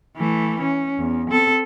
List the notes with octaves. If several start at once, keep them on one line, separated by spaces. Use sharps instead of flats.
E3 A3
C#4
E2
C4 A4